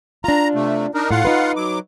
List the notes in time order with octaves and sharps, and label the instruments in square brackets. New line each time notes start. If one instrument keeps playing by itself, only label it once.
[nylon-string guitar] D4 F4 [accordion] A#5
[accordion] C3 A3
D4 D#4 A#4
[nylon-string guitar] A2 [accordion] F4 F5 F#5
[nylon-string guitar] D#4 B4
[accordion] F#3 D6